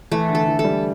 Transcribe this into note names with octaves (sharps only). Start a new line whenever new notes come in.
E3 A3
D3
A4
D3
E3
A4
G3